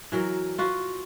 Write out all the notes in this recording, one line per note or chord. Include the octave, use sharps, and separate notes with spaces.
E3 F#3 A#4
F4 F#4 B4